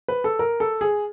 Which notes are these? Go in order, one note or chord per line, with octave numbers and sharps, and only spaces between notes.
B4
A4
A#4
A4
G#4